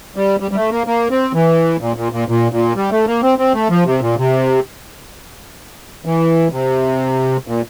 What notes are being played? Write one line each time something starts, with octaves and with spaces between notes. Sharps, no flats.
G3
G3
G3
A3
A#3
A#3
C4
E3
A#2
A#2
A#2
A#2
A#2
G3
A3
A#3
C4
C4
A3
F3
C3
A#2
C3
E3
C3
A#2